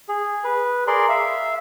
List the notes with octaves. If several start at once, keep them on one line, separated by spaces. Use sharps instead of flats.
G#4
B4
G#4 A#4 D5 C6
E5 F5